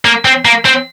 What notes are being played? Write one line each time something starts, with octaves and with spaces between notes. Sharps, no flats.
A#3
C4
A#3
C4